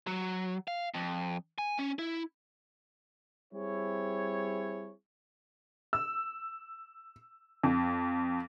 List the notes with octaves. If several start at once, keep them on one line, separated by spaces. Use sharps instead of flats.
F#3
F5
F2
G#5
C#4
E4
G3 C4 E4 G#4 C#5
E6
F2